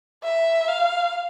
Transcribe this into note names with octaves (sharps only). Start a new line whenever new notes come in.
E5
F5